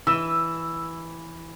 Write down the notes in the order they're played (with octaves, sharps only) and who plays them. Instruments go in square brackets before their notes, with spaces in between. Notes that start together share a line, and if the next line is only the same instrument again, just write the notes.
[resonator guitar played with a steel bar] E3 [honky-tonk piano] E6